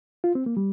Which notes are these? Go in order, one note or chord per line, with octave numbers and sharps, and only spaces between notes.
F4
C4
A#3
G3